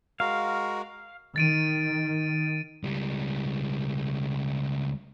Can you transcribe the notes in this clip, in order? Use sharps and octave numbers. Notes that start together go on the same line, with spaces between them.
G#3 F#4 A#4 F5
D#3 A6 D7 D#7
C#2 G3